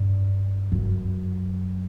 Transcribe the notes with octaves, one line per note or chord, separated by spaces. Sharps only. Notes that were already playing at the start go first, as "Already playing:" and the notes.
Already playing: G2
F#2